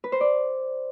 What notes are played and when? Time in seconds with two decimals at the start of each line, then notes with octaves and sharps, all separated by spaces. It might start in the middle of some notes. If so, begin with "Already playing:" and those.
0.04 B4
0.12 C5
0.21 D5